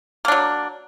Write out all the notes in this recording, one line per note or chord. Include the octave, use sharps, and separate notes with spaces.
F#3 A#3 D4